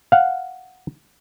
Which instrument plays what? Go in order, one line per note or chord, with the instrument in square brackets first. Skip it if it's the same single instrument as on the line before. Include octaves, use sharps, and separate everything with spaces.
[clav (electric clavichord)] F5 F#5